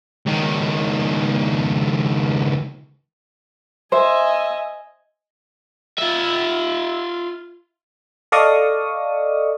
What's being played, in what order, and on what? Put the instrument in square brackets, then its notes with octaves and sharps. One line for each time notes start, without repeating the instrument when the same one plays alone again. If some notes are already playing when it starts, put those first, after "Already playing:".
[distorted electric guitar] C#2 D#3
[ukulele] C5 [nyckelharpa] D#5 G#5 [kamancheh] E5
[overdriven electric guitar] F4 E5
[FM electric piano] A4 D5 D#5 F5 C#6 D#6